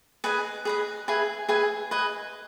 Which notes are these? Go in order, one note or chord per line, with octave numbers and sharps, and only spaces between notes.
G#4 B4 D#5
G#4 B4 D#5
G#4 B4 E5 G#5
G#4 B4 E5 G#5
B4 D#5 G#5